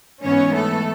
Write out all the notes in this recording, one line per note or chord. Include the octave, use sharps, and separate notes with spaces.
G#2 E3 B3 C#4 C#5
A3 A4